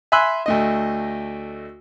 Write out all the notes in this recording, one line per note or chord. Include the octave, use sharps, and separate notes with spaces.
E5 G#5 B5 C6 E6 F#6
D2 A3 D#5